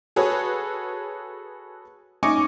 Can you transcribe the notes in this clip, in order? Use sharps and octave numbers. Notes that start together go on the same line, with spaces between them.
F#4 G#4 A4 B4 C#5
C#4 D#4 G#5 C#6 D6 C#7